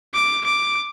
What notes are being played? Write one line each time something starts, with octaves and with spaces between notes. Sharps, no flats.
D6
D6